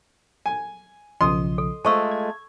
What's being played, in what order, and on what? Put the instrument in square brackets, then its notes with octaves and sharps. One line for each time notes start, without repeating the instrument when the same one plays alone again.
[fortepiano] G#5
[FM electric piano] B1 C#3 F3 [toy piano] D#5 [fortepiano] C6 D#6
[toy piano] A4
[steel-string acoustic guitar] G#3 A3 F4 [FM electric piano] C5 [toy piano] A5 C#6 E6
[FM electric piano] G#6